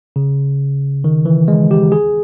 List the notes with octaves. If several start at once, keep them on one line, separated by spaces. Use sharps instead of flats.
C#3
D#3
E3
G#3
G4
G#4